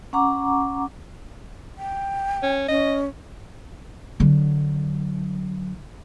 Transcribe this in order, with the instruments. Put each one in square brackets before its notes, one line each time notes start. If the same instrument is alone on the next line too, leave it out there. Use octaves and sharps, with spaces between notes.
[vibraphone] C#4 F#5 A#5 C#6 D6
[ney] G5
[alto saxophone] C#4
[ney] C#4 [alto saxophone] D#5
[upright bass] D3 F#3